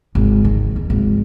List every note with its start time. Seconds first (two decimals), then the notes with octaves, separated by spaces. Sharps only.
0.15 G#1
0.45 D#3
0.76 F2
0.90 G#1